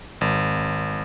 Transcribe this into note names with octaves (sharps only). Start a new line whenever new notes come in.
G#1